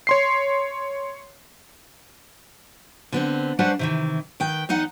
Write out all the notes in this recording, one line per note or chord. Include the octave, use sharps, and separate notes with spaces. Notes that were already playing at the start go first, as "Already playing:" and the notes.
C#5 C6 C7
D3 B3 C4
G3 C#4 D4 B4 C5 F#5
C3 D#3 E3
D#3 B4 G5
E2 B3 D#4 F#5